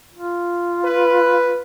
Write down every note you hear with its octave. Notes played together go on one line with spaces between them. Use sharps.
F4
B4